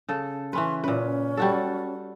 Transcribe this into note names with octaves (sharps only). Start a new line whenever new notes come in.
C#3 A4
E3 C#4 B4 C6
A#2 C#4 B4
G3 F#4 A4